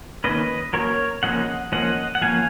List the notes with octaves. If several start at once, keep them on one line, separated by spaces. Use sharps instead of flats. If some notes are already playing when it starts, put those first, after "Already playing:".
D#3 A#3 C#4 B4 D#5
F#3 A#3 C#4 A#4 C#5
C#3 F3 A#3 C#4 D#5 F#5
F3 A#3 C#4 D#5 F#5
F#5
F3 A#3 C#4 F5 G#5